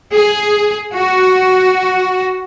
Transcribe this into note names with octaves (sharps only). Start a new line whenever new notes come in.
G#4
F#4